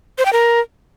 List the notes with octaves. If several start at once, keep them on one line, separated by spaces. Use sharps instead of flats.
C5
G5
A#4